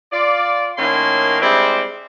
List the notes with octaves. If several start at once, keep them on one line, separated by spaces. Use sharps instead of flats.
F4 D5
A2 D#3 A#3 C#4 C6
G3 G#3 C4 D4 E4